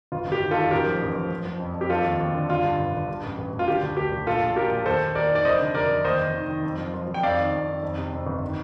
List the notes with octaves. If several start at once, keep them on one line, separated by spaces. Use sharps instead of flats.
G1 F4
G1 G4
D#3
F4 A4
D#3
A1 G4 A#4
F3
A1
F3
F3
F3
F2
F2
G4
F3 F4 A4
D#2
D#2
D3
D3 F4
G2
G1
G1
G2
A1
A1
A1
F4
D3 G4
D2
D2 G4
D2
A#2 F4 A4
A#1
A#2 G4 A#4
A#1
D#2 A4 C5
D#2
D#2 A#4 D5
D#3
D5
F1 C5 D#5
D3
F1 A#4 D5
F1
D#2 C5 D#5
F1
D#3
D#3
F2
F3
F3
F3
G5
F2 D5 F5
D#3
F2
D#3
F2
C3
F2
G1
D#3